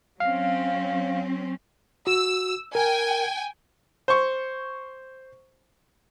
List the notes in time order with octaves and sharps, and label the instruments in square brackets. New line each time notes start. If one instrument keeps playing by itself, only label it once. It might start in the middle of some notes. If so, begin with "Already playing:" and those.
[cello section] F#3 C4 C#4 [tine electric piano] F5
[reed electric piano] F#4 [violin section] E6
[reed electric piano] A#4 [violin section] G5 G#5
[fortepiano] C5 C#6